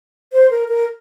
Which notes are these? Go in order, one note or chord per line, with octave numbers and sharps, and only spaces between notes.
C5
A#4
A#4